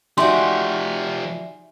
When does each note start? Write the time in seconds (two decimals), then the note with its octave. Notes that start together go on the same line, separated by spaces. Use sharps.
0.18 F3 D#4 F#4 G4 D5 E5 G#5 C6